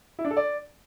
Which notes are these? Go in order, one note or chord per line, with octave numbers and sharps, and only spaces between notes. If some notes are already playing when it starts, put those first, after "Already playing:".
E4
D4
A4
D5